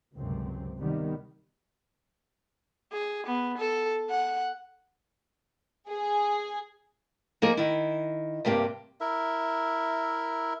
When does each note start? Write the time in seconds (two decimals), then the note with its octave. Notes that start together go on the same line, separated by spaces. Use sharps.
0.15 G1 C#2 F#2 C3 C4
0.77 C3 D#3 G3 B3
2.93 G#4
3.26 B3
3.58 A4
4.10 F#5
5.89 G#4
7.42 F3 A#3 D#4 G#4 A#4
7.57 D#3 E4
8.45 G2 C3 A#3 G4
9.00 E4 A#4 E5